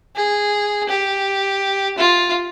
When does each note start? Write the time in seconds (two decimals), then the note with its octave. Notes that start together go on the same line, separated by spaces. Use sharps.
0.16 G#4
0.89 G4
1.98 F4